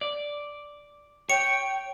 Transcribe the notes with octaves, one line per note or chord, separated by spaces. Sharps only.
D5
C#5 G5 C#7